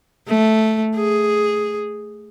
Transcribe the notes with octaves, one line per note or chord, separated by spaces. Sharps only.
A3
G#4